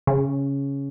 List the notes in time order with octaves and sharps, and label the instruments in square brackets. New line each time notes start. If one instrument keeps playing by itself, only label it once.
[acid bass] C#3